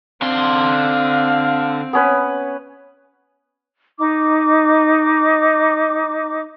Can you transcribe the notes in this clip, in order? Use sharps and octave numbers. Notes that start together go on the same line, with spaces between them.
D3 C4 F5 C6
B3 C#4 B4
D#4 D6